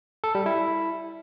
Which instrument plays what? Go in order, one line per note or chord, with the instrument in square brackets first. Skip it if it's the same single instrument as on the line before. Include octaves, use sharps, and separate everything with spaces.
[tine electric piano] A4
G3
E4